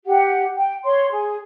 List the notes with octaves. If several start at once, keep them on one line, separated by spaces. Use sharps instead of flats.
G4 F#5
G5
C#5 C6
G#4